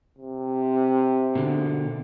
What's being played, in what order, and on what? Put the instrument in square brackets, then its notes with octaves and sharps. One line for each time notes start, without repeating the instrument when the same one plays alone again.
[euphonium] C3
[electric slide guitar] B2 D3